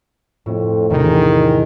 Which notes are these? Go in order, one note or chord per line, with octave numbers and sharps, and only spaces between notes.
F2 A2
E1 E2 C3 D#3